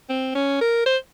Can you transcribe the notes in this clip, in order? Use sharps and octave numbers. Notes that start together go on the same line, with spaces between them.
C4
C#4
A#4
C5